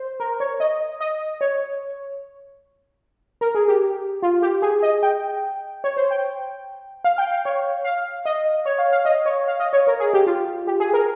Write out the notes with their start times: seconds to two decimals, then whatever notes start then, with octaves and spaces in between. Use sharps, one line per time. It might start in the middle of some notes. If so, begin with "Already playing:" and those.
Already playing: C5
0.20 A#4
0.40 C#5
0.60 D#5
1.01 D#5
1.41 C#5
3.41 A#4
3.55 G#4
3.68 G4
4.22 F4
4.42 G4
4.62 G#4
4.82 D#5
5.03 G5
5.84 C#5
5.97 C5
6.11 G5
7.04 F5
7.18 G5
7.31 F5
7.45 C#5
7.84 F5
8.25 D#5
8.65 C#5
8.78 F5
8.92 F5
9.05 D#5
9.25 C#5
9.48 F5
9.59 D#5
9.73 C#5
9.87 A#4
10.00 G#4
10.13 G4
10.27 F4
10.67 G4
10.80 G#4
10.93 A#4